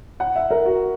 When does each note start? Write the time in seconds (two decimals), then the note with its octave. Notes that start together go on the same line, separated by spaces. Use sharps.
0.20 F#5
0.36 E5
0.51 A#4
0.66 F#4